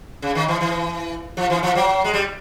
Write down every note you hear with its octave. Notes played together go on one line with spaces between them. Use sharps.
C#3
D#3
E3
E3
F3
E3
F3
F#3
G#3
G3